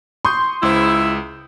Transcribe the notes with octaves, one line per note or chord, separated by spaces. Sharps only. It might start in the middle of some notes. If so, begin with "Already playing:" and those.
C6 C#6 D#6 G6
C#2 E4 C5